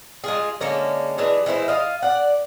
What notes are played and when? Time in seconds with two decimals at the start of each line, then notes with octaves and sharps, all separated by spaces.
0.24 G#3 F4 G#4
0.60 D3 G#3 A#3 C#4
1.18 E3 G#3 D4 G#4
1.46 E3 G#3 E4 C5
1.68 F4 D#5 F5
2.02 D5 F#5